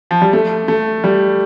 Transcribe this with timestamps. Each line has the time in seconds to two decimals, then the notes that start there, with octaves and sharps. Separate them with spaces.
0.11 F3
0.22 G3
0.33 A3
0.68 A3
1.04 G3